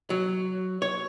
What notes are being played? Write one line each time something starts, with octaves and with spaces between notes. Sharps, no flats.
F#3
C#5